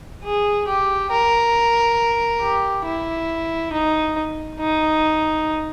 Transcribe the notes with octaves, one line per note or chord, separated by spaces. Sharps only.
G#4
G4
A#4
G4
E4
D#4
D#4